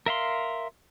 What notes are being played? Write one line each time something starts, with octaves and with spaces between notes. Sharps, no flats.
A#4 E5 F5 C6